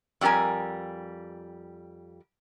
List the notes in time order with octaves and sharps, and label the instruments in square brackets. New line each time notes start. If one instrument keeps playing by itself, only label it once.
[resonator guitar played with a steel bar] F2 G3 F#4 A#4 G#5